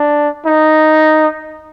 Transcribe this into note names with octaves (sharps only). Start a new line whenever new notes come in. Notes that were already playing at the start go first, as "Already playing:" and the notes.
Already playing: D4
D#4